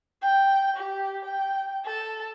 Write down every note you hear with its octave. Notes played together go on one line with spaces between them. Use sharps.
G5
G4
G5
A4